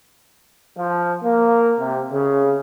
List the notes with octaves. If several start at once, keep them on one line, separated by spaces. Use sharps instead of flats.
F3
A#3
C3
C#3